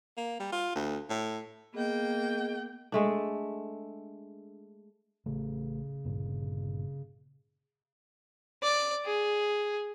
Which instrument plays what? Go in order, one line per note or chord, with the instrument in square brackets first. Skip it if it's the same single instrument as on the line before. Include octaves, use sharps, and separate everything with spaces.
[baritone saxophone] A#3
G3
F4
D2
A2
[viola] A#3 G5 [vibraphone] B3 G#4 D#5
[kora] G#3 A3 D4
[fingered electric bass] A1 A3 [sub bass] C#3
[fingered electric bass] G1 G2 A#2
[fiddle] D5
G#4